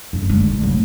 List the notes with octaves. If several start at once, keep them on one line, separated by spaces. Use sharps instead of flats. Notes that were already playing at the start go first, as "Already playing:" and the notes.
F#2
D3 G#3
A#1
F1 F#3